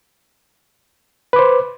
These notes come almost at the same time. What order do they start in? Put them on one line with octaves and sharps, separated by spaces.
B4 D6 C5